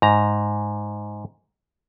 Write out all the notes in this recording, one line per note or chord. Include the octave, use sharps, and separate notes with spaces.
G#2 A#5